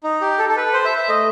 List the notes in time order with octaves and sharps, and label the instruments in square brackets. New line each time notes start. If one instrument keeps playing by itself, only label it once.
[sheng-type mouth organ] D#4
G4
A4
A4
B4
C5
E5
E5
[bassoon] A3 [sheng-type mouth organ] D#5